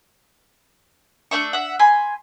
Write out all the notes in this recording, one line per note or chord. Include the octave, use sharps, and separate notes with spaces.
A3 D4 E5 C#6
E5 F#5
G#5 B5 C6